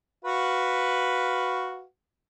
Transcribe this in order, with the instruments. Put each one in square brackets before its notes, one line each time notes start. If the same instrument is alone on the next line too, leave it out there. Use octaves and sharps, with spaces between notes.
[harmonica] F#4 B4 F5